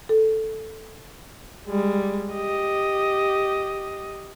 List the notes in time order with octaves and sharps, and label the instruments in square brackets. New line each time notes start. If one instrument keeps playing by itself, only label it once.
[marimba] A4
[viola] G3 G#3
G4 D#5